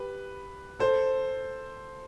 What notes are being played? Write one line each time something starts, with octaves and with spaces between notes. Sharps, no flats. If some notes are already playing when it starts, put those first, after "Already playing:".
Already playing: G4 B4
A4 C5